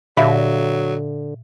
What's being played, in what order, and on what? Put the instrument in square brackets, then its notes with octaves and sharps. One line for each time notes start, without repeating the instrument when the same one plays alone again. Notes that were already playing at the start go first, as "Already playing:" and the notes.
[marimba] A#2 [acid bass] D3 [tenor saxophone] F#3 [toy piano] E5 F5